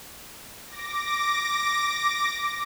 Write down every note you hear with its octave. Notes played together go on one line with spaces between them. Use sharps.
D6 A#6